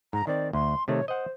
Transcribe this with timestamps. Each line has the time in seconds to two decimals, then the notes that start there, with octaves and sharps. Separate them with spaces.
0.13 G#2 A#5
0.27 D#3 C4 D5
0.53 D2 C6
0.88 C3 D#3 A3 C#5
1.08 C5 D#5 F#5